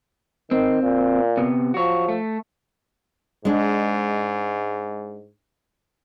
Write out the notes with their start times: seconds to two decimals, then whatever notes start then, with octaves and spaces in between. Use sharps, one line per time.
0.51 D#3 C4
0.83 A#2
1.37 C3 B3
1.74 F3 F#4 C#5
2.08 A3
3.45 G#2 G#3 D4